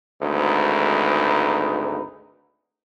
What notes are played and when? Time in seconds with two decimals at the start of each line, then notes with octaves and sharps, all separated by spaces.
0.22 G#1 D2 G#2 D#4 B4